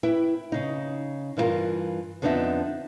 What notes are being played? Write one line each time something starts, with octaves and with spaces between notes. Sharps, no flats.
E4 B4 G5
C#3 D#4
G2 E3 E4 F4 A#4
F2 D3 B3 D4 D#4 E5